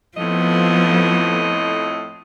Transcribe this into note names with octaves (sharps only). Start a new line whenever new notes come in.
F2 A2 F3 B3 D#5